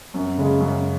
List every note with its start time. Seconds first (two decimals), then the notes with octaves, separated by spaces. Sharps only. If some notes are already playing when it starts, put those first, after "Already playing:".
0.14 F#2
0.38 C#3 G#3
0.60 F#2